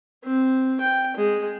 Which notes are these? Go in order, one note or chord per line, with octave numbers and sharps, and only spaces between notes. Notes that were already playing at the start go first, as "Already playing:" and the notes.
C4
G5
G#3